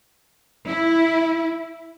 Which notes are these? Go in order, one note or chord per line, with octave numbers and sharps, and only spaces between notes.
E4